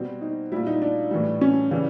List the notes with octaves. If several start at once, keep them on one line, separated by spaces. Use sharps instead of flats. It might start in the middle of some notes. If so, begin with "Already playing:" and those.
Already playing: B2 G3 C4
D#4
A#2 G3 E4
D#4
D4
A2 E3 G3
C#4
C#3 E3 G3